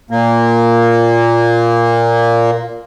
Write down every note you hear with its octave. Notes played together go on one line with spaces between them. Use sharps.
A#2 A#3